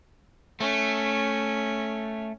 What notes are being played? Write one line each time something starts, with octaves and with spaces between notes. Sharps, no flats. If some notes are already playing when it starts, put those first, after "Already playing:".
A3 C#4